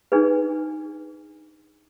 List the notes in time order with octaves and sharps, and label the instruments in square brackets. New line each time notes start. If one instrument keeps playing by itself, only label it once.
[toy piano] D4 D#4 G#4 B4